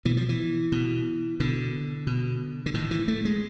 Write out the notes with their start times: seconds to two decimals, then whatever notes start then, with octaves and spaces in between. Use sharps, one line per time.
0.05 B2 E3
0.17 F3
0.29 E3
0.72 B2
1.40 B2 D3
2.07 B2
2.66 D3
2.74 A2 D#3
2.91 E3
3.08 A3
3.25 G#3